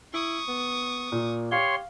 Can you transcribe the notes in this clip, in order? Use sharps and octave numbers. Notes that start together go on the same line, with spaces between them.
E4 C#6 D#6
B3
A#2 A#3
G4 C#5 F5 C6